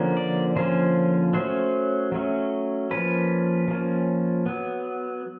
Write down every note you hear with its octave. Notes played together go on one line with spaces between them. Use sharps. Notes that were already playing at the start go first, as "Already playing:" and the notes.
Already playing: D3 F3 A#3 C#4
D5
D3 F3 A#3 C#4 C5
F#3 A3 C#4 C5
F#3 A3 C#4
F3 A#3 C#4 B4
F3 A#3 C#4
F#3 B3